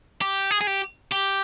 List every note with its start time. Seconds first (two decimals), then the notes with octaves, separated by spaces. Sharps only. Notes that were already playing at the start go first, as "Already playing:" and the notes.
0.21 G4
0.51 G#4
0.61 G#4
0.67 G4
1.11 G4